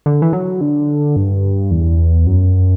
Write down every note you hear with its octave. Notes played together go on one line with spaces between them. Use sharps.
D3
E3
F#3
D3
G2
E2
F#2